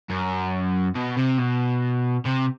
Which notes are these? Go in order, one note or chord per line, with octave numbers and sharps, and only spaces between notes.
F#2
B2
C3
B2
C3